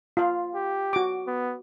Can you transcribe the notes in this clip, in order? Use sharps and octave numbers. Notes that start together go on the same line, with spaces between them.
F4 F5
G4
F#4 D6
B3